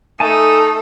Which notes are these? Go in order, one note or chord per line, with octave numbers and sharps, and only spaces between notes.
A3 D#4 A4 G#5 A5